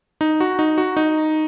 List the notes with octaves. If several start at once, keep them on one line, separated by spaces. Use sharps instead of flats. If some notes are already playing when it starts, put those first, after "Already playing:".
D#4
F#4
D#4
F#4
D#4